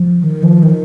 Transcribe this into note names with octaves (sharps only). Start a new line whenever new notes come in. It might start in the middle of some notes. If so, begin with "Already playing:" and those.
Already playing: F3
D#3
F3
D#3